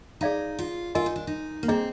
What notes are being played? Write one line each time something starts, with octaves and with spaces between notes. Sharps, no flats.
D#4 G#4 D5 F5 A#5
F4
F4 A#4 D#5 G#5 C6
D#4
D4
D#4
A#3
C4 D4 G#4 D#5 A#5